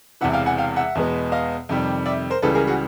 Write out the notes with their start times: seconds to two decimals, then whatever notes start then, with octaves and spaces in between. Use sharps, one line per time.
0.21 E1 E2 C3 E3 E5 F#5
0.33 F5 G5
0.46 F#5 G#5
0.58 F5 G5
0.76 E5 F#5
0.95 E2 B2 G#3 B3
1.32 D#5 F5
1.69 F2 C3 D#3 G3
2.06 D5 E5
2.30 A#4 C5
2.42 C#2 C#3 E3 G3 A4 B4
2.55 G#4 A#4
2.67 F#4 G#4